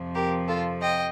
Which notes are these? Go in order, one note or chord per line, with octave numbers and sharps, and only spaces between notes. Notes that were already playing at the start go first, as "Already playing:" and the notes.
Already playing: F2 C3 F3
G4 A#4
F4 A4
D#5 G5